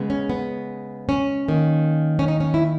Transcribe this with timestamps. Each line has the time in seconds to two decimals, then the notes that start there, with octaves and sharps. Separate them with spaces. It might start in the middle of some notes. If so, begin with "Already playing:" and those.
Already playing: C#3 G#3 B3
0.10 C#4
0.30 B3
1.09 C#4
1.48 D#3 A#3
2.19 C#4
2.28 D#4
2.40 C#4
2.54 E4